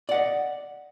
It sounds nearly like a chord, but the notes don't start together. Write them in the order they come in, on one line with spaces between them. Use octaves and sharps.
D5 F#5 D#5